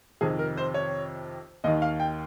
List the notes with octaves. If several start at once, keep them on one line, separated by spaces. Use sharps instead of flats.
F2 C3 D#3 G#4
A#4
C5
C#5
D#2 D#3 D#5
F5
G5